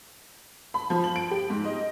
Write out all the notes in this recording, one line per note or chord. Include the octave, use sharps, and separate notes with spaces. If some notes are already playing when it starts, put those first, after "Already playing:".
B5
F3
F#7
D7
G4
G#2
D#5